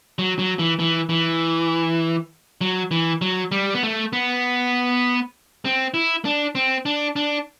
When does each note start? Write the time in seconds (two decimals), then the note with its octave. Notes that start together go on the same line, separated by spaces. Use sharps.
0.19 F#3
0.39 F#3
0.59 E3
0.79 E3
1.09 E3
2.61 F#3
2.91 E3
3.22 F#3
3.52 G3
3.74 B3
3.83 A3
4.13 B3
5.65 C4
5.94 E4
6.25 D4
6.55 C4
6.86 D4
7.16 D4